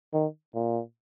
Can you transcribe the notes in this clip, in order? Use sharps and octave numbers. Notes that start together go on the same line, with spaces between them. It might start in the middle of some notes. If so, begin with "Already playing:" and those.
D#3
A#2